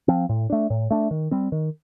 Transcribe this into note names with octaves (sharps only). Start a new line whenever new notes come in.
F3 C4
A2
A3 D4
A2
A3 D4
D#3
G3 C4
D#3